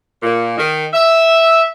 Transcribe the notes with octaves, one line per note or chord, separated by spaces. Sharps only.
A#2
D#3
E5